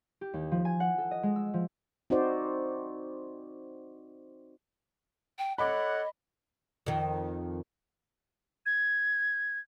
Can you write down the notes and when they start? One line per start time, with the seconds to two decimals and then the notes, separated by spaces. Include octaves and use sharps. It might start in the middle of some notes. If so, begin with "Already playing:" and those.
0.21 G4
0.33 D#2
0.52 F3
0.65 G#5
0.80 F#5
0.98 A4
1.11 D#5
1.23 G#3
1.36 E6
1.54 F3
2.10 C4 D#4 F#4 C5 D5
5.39 G5
5.58 A4 C#5 D#5 F#5 B5 D6
6.86 F2 D#3
8.66 G#6